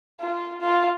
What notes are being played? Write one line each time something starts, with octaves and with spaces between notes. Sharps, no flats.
F4
F4